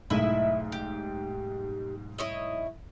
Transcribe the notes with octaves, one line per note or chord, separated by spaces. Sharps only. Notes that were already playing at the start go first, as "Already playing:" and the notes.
B1 G#2 A3 E4 D#5 E5
G4
E4 C#5 D#5